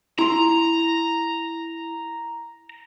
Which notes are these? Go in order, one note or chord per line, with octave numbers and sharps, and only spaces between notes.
E4 A#5 C6